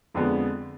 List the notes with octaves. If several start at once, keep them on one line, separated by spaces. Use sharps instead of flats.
F2 D3 F3 G#3 B3